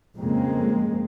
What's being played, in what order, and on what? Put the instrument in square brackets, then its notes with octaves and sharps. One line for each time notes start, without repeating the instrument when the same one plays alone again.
[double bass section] F2 C#3 G#3 A#3 C4